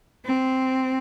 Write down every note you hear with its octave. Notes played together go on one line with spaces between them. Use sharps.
C4